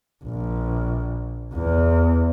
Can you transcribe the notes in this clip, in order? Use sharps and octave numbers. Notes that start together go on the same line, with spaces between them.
A#1
E2